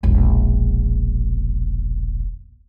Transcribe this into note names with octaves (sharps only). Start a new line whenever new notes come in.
E1 A#1